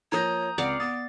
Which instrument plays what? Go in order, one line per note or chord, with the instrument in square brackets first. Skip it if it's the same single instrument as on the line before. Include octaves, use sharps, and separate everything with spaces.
[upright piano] F3 A#3 A#6 [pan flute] C#5 [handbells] A#5 D#6 G6
[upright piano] C#2 [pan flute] C4 [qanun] D5 F5 F#5
[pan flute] B3 [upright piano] D#6 [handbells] A6